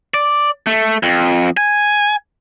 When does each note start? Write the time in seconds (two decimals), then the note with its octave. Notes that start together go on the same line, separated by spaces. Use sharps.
0.14 D5
0.67 A3
1.03 F2
1.57 G#5